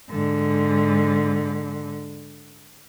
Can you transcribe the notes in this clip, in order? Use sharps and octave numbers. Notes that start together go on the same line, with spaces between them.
G#2 D3